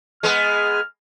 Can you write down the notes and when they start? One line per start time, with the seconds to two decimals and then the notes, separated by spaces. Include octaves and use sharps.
0.23 G#3 B3 F6